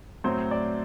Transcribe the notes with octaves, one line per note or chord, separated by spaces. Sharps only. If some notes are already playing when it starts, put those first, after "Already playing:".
A2 F#3 C4 C5
D5